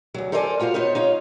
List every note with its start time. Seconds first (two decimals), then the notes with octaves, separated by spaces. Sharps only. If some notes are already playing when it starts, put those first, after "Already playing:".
0.14 D2 F#3
0.32 A4 A#4 C5 D5 E5 G#5
0.60 F4 F#4 A#4 C5 F5
0.74 B3 D#4 C5 C#5
0.95 D#4 F4 C#5